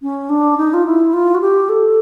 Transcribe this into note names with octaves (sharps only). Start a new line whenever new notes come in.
C#4
D4
D#4
F4
E4
F4
F#4
G4
A4